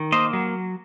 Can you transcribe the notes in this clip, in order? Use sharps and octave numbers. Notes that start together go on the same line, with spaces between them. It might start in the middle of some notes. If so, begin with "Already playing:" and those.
Already playing: D#3
A#3 C5 D#5
F#3